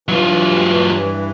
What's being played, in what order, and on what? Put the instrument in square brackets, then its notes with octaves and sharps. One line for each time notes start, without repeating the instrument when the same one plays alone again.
[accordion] G2 E3 [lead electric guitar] F#3 F4